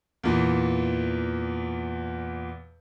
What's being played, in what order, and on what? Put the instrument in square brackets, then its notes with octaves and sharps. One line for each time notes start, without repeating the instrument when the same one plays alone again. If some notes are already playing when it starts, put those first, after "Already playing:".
[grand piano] E2 A#2 E3